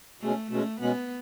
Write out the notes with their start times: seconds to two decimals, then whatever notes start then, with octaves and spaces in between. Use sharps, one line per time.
0.21 B2 G#3 A3 C#4
0.50 B2 G#3 A3 C#4
0.80 B2 G#3 B3 C#4